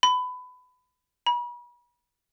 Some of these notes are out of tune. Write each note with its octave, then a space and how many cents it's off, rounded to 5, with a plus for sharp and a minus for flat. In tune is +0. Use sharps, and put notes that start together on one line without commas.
B5 +20
B5 -40